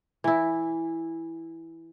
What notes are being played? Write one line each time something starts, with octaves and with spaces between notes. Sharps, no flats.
E3 E4